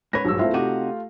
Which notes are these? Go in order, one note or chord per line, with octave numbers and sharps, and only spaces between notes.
G#2 C#4 B4 C#5 A#6
A#1 G2 F#3 E6
A3 C4 E4 F4 E5
C3 D#4 F#4 G4